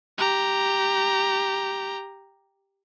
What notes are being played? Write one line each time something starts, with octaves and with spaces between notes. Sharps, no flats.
G4 A#5